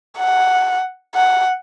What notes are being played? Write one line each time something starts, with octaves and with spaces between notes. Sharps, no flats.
F#5
F#5